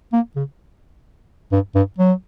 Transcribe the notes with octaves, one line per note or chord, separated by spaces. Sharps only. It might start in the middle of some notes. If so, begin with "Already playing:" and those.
A#3
C#3
G2
G2
F#3